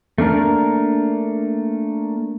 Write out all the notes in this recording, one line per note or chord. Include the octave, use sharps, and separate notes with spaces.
A3 A#3 D4 A#4